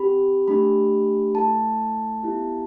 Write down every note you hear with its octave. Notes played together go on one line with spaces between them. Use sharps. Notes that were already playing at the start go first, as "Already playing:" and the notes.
Already playing: C4 G4 B5
A3 D4 G4 B5
A3 E4 A4 A5
B3 E4 G4